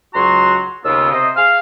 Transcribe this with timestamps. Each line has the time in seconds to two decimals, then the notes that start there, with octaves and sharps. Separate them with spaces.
0.14 C#2 F#3 F#4 A#5 C6
0.85 D#2 C#3 B3 F4 E6
1.12 C3 C5 D#5
1.36 G#4 F5